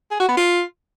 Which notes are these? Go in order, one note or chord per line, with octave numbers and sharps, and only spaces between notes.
G#4
F#4
B3
F4